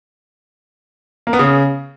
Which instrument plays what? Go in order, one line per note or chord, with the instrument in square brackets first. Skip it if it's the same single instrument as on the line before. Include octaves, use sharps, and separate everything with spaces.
[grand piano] A#3
B3
C#3